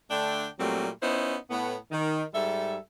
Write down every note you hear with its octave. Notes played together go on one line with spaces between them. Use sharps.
D3 A3 D4 G5
A#2 F#3 G3 A3 C4
B3 C#4 D#4 E4 C5
A2 B3
D#3
G#2 G3 A4 E5